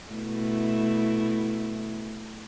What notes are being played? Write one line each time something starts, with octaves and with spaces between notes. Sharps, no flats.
B2 A3 E4